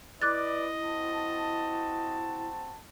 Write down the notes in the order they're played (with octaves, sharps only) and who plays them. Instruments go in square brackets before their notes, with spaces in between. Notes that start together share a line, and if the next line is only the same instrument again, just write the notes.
[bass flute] E4 [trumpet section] B4 D5 [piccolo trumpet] D#5 [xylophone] D6 F#6 A6
[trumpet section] C4 F#4 A5